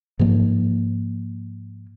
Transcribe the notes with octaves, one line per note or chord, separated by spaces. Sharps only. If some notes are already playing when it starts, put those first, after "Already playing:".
G#2 F3 A#3